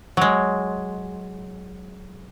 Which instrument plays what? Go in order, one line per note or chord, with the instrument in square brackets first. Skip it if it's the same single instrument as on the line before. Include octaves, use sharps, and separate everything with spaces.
[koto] F#3 G#3